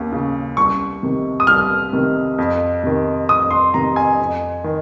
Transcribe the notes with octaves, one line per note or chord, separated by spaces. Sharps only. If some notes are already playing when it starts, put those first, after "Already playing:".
Already playing: D#2 C#3
C#3
C2 C#6
C3 D#3
D#6
C2 F6
C3 D#3
F2
C3 D#3
F2 D#6
C6
C3 D#3 A#5
G#5
F2
D#3